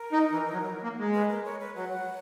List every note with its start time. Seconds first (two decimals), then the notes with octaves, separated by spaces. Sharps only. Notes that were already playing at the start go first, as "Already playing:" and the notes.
Already playing: A#4
0.12 D#4
0.32 E3
0.53 F#3
0.83 A#3
0.99 G#3
1.14 B4
1.30 A#4
1.45 C#5
1.60 B4
1.76 F#3 F#5